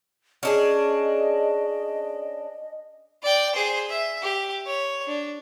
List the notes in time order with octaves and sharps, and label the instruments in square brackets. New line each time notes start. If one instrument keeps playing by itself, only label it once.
[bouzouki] C#4 D4 G#4 [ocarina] D#5
[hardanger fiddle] D5 G5
G#4 C5
E5
G4
C#5
D4